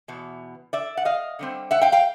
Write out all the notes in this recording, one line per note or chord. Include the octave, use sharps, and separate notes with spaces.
E2 B2
D5 E5
F#5
D#5 F5
D3 G3 C4
E5 F#5
F5 G5
F5 G5